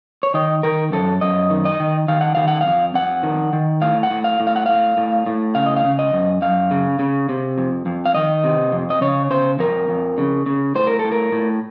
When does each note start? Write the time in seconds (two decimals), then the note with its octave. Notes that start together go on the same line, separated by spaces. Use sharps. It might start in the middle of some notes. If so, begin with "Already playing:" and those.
0.23 C#5
0.34 D#3 D#5
0.63 D#3 A#4
0.92 F#2 A4
1.21 F#2 D#5
1.50 D#3
1.65 D#5
1.80 D#3
2.08 D#3 F5
2.21 F#5
2.35 D#3 F5
2.48 F#5
2.61 F2 F5
2.94 F2 F#5
3.23 D#3
3.53 D#3
3.82 A2 F5
4.03 F#5
4.10 A2
4.24 F5
4.40 A2
4.47 F5
4.56 F#5
4.66 A2 F5
4.97 A2
5.26 A2
5.55 C#3 F5
5.66 D#5
5.76 F5
5.84 C#3
5.99 D#5
6.13 F#2
6.42 F#2 F5
6.71 C#3
6.99 C#3
7.29 C3
7.58 F2
7.86 F2
8.05 F5
8.14 D#3 D#5
8.44 C3
8.72 F2
8.90 D#5
9.01 C#3 C#5
9.30 C#3 C5
9.59 F2 A#4
9.89 F2
10.18 C#3
10.46 C#3
10.75 A2 C5
10.87 A#4
10.99 A4
11.05 A2
11.12 A#4
11.32 A2